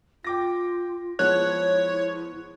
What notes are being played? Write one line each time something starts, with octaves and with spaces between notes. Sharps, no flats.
F4 G5 D6 A#6
F3 G#3 B3 E4 C#5 F#6